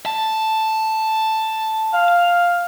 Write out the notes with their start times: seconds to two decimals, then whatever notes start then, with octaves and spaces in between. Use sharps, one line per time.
0.06 A5
1.93 F5